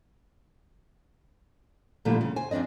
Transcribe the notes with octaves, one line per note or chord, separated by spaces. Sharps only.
A#2 D3 F3 G3 A3 E4
C#3
C5 G#5
F2 C4 D4 D5 D#5